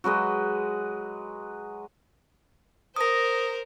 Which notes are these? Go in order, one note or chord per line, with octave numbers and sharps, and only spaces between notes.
F#3 G#3 B4 D#5
A#4 C5 D#6 A#6